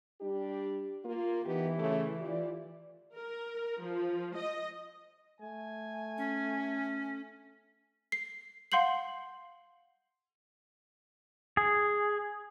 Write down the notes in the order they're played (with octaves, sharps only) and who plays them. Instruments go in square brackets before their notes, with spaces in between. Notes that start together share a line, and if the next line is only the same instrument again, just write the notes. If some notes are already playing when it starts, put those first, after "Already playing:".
[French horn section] G3 D4 G4
A#3 F4
[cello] E3 [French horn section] B3 D#4 G4
[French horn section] C#3 A3
F4 G4 D5
[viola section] A#4
F3
D#5
[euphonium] A3 [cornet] G#5
[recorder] C#4
[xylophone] C7
F5 F#5 C6 G6 C7 F#7
[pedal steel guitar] G#4